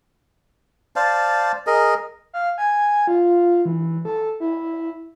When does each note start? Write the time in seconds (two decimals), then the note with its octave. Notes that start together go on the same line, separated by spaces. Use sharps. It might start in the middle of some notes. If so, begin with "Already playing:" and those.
0.96 C5 D5 F5 A5
1.67 G#4 A#4 D#5
2.33 F5
2.58 G#5
3.07 F4
3.65 E3
4.05 A4
4.40 E4